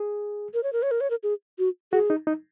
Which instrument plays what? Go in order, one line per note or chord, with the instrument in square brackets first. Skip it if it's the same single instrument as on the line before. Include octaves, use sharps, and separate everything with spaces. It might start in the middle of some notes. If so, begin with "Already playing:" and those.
Already playing: [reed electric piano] G#4
[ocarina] A#4
C#5
A#4
C#5
A#4
C#5
A#4
G#4
F#4
[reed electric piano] F#4 [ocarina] G#4
[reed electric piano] D#4
D#4